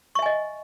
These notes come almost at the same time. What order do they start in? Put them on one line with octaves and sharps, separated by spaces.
C#6 E5 G#5 D#5